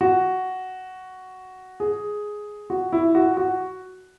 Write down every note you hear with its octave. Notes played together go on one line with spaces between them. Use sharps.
F#4
G#4
F#4
E4
F#4
F#4